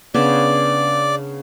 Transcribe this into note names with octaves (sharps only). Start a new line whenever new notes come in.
C#3 B3 D4 D5